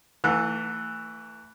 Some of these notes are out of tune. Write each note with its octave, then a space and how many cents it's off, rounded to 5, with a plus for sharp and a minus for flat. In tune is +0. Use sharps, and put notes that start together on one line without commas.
E3 +0 A3 +30 F#5 -30